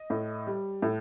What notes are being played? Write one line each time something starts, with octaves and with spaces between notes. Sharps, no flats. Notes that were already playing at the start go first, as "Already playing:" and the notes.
Already playing: D#5
A2
G3
A2